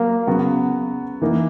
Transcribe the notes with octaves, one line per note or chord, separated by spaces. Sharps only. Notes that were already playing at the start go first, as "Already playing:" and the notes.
Already playing: F#3 A#3
C#3 F#3 B3 F#4
E3 A#3 D#4